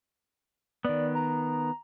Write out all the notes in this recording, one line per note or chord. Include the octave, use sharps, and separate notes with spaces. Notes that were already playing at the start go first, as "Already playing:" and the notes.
D#3 B3 D5
A#5